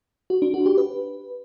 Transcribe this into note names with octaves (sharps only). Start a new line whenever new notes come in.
F#4
D4
F#4
G4
B4